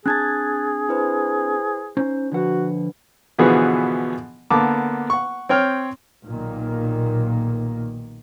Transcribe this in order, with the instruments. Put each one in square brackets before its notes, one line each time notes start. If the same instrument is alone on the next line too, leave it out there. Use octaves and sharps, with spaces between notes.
[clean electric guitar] C4 D4 A5 [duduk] G#4 [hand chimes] F#6 G#6 A6
[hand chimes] E4 B4 C5
[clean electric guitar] C#4 D#4 C5
[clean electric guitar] D3 F3 F#5 [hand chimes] D4 B4 [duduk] F#4
[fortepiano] B2 D3 E3 F3 B3 G#4
D3 A#3 B3 A5 D6
F#5 C#6
C4 C#5 G5 F6
[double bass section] B1 A#2 D#3 A#3